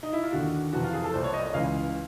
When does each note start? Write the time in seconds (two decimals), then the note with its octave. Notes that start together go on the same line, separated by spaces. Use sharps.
0.03 D#4
0.13 E4
0.23 F4
0.32 D#2 D3 F#4
0.73 F2 C3 E3 F#4
0.83 F4
0.93 G#4
1.04 A4
1.13 C2 A#2 C5
1.24 C#5
1.34 D#5
1.44 D#5
1.54 C#2 C#3 E3 F5